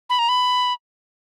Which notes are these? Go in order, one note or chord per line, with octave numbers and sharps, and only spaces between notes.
B5
A#5
B5